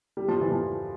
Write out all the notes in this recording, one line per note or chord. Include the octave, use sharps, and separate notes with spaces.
G3
F3
E3
F3